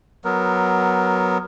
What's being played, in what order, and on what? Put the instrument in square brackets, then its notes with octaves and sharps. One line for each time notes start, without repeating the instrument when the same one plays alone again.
[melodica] F#3 B3 A#4